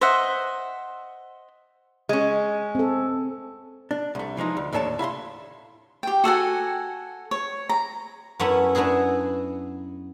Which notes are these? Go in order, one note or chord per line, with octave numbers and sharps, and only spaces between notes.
C5 D#5 E5 F#5
G#3 C#4
C4 A4
D4
C2 A3
E3 F3 G#3 D#4
D2
D#2 A2 D4 A4 C#5 A5
E4 F5 B5 C6
G4 G5
F#4 A4 F#5 G#5
C#5
A#5
F#2 A3 B3 C#4 E4 B5
B3 D4 E4 F#4 G#4